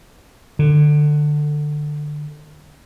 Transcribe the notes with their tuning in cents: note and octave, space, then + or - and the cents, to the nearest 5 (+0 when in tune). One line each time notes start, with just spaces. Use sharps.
D3 +20